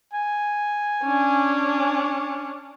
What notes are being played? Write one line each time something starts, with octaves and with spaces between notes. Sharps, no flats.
G#5
C#4 D4